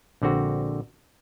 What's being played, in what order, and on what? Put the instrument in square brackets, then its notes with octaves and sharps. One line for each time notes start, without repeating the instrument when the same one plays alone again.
[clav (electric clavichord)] A#1 D3 C4 F#4